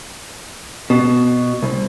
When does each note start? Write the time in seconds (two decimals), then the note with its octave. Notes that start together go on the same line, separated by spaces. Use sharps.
0.90 B2
1.63 C2